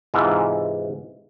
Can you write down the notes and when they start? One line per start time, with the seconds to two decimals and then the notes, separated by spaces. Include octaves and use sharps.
0.14 G#2 C3 E3 F4